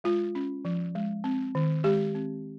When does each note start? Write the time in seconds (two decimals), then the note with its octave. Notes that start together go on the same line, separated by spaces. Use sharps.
0.04 G#3 F4
0.35 C#4
0.65 F3
0.95 G#3
1.24 C4
1.55 D#3
1.84 G#3 G4
2.15 C4